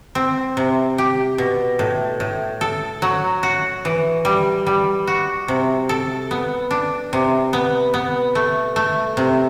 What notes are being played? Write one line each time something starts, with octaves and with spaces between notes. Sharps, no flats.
C4
C3
G4
B2
A2
A2
A4
F#3
F#4
E3
G3
G3
F#4
C3
A4
B3
D4
C3
B3
B3
A3
A3
C3